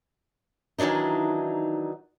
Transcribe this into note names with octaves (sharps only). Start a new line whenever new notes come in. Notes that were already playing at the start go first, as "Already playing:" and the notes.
D#3 E3 F#3 D4 D#4